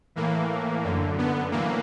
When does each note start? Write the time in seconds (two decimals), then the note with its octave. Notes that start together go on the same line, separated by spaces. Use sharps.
0.16 A2 E3 A#3
0.84 F#2 D3
1.18 B3
1.51 A2 E3 A#3